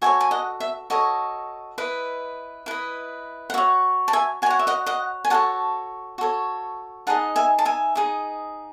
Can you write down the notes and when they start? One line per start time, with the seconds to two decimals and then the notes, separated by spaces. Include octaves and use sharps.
0.02 F#4 A4 C#5 E5 G#5
0.21 G#5
0.31 D#5 F#5
0.60 E5
0.90 F#4 A4 C#5 D#5
1.78 E4 B4 D#5
2.66 E4 B4 D#5
3.50 F#5
3.54 F#4 C#5 E5
4.08 A5
4.13 E5 G#5
4.42 F#4 G#5
4.46 C#5 F#5
4.59 E5
4.67 D#5 F#5
4.86 D#5 F#5
5.25 G#5
5.30 F#4 A4 C#5 F#5 A5
6.18 F#4 A4 C#5
7.07 D#4 G#4 D#5 F#5 A5
7.36 E5 G#5
7.59 A5
7.65 E5 G#5
7.95 D#4 G#4 D#5